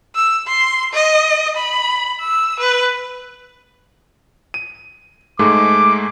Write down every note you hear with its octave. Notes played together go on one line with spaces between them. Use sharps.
E6
C6
D#5
B5
E6
B4
D#7
G#2 G#3 A3 D6